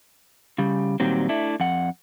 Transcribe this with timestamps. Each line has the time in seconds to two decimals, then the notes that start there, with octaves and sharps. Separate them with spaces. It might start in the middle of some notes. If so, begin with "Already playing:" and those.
0.58 C#3 G3
1.00 A#2 D#3 F#3 G3 C4
1.29 A3 D4 E4
1.60 F2 F#5